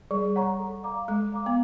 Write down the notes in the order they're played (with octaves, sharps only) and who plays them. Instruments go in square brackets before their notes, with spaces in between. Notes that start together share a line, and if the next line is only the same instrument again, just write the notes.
[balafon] G3 [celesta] G#4
[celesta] C#5 F#5 A#5 C#6
A4
D5 F5 A#5 D6
[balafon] G#3 [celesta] A4
[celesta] D5 F5 A#5 D6
[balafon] B3